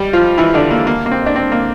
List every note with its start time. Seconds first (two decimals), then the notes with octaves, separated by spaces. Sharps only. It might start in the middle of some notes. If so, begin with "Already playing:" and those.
Already playing: G3 G4
0.13 F3 F4
0.38 E3 E4
0.54 D3 D4
0.71 A#3
0.87 A#3
1.06 A#3
1.11 C4
1.26 D4
1.36 C4
1.52 A#3